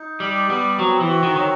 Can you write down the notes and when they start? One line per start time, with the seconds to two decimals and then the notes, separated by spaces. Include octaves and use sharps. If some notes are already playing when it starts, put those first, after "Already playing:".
Already playing: D#4
0.20 G3 G4
0.49 G3 B3
0.78 F#3 C4
1.01 E3
1.08 F#4
1.23 D#3
1.36 D#3 F#3